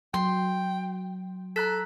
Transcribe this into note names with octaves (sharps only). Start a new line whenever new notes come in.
F#3 G5 C6
A4 A#5 F#6 B6